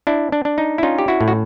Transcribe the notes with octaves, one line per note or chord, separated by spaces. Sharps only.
D4 E4
D4
D4
D#4
E4
C#4 D#4 F4
G4
E4 F#4
A2
F#4